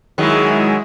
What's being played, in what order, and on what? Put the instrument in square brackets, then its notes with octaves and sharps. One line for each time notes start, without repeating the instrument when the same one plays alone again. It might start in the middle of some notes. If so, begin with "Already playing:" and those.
[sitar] D#3 F#3 [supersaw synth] G#3 E4 G#4